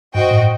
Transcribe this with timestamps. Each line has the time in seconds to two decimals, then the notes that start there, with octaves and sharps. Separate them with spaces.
0.15 G2 F#4 C5 D#5 G5
0.31 A2